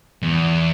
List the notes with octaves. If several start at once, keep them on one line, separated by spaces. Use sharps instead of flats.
E2